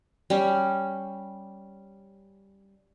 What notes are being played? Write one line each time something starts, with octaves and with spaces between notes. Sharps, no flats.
G3 C#4